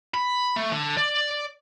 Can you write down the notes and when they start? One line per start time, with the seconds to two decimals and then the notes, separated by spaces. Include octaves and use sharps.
0.14 B5
0.56 A3
0.72 D3
0.97 D5